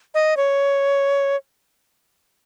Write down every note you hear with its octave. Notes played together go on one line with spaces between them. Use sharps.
D#5
C#5